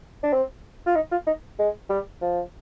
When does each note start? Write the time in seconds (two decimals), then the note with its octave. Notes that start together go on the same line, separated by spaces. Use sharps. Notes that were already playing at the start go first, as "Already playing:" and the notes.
0.23 D4
0.33 C4
0.86 F4
0.95 D#4
1.12 F4
1.27 D#4
1.59 G#3
1.89 G3
2.22 F3